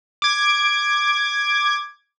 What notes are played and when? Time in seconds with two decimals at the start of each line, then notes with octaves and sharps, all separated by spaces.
0.22 D6 G#6